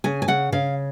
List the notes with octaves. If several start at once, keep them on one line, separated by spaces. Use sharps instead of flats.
C#3 G#5
G#5
C#3 F#5
C#3 F5